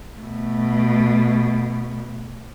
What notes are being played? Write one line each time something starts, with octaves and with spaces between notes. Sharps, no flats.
B2 A3